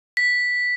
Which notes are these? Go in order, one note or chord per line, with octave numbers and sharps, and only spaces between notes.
B6